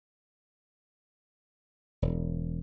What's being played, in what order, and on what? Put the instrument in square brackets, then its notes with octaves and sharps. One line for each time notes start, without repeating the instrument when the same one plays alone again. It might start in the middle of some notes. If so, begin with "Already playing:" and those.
[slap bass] E1